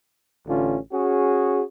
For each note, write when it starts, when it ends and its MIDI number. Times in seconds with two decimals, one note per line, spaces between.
0.46 0.77 33
0.46 0.77 50
0.46 0.77 61
0.46 0.77 65
0.92 1.62 61
0.92 1.62 66
0.92 1.62 68